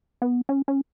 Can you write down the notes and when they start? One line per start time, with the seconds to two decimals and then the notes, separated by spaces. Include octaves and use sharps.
0.22 B3
0.49 C#4
0.68 C#4